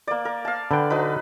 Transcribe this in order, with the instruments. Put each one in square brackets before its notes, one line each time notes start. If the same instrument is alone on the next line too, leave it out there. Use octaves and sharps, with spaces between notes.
[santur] A#3 D5
A#4
F5 A5
[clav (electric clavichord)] D3 G5 [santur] B4
[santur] F#3 D#4 B4